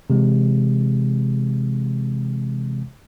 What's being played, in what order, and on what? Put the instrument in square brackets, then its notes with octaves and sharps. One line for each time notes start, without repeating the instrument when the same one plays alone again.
[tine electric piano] C3 E3 G#3